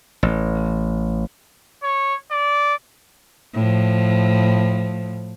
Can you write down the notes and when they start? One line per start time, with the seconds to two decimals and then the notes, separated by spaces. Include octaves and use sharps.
0.23 A1
1.83 C#5
2.31 D5
3.54 A2 F3